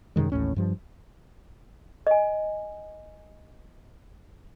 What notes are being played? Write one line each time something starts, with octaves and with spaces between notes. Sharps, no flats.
F#2 C3 D#3 G#3
A1 D#2 A2 C#4
G2 F3 G3
D#5 G#5